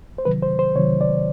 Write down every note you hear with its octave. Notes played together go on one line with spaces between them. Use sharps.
C5
C3 D#3 F#3 B4
C5
C5
C3 D#3 F#3 C#5
D5